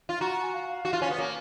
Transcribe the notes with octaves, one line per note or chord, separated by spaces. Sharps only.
F4
F#4 A#5
A#5
G#5
F5
F5
F#4
F4
C#4
B3
A#3 C#5